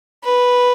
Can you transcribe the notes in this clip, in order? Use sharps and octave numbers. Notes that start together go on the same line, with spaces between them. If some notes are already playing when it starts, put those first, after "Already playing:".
B4